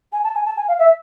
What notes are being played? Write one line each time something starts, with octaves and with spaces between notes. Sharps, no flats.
G#5
A5
G#5
A5
G#5
F5
E5